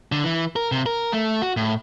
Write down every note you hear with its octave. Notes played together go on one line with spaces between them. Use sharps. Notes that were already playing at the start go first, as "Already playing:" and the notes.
D3
E3
A#4
C3
A#4
A3
F#4
A2